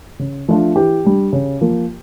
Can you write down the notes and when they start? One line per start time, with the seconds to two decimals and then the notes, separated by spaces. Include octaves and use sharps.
0.19 C#3
0.48 F3 A3 D4 F4
0.75 E3 G4
1.05 G3 D4
1.33 C#3
1.61 F3 A#3